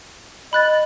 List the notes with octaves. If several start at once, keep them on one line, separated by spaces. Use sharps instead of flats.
D#5 B5 F#6 A6